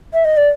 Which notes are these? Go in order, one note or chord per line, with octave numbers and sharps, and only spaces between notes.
E5
D#5
D5